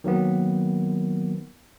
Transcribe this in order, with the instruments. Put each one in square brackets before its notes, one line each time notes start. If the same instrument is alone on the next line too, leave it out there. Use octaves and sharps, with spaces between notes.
[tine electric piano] D#3 F#3 A#3 B3